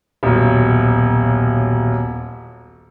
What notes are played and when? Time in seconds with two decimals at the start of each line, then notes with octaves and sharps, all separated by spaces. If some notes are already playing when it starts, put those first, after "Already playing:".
0.23 D#1 B1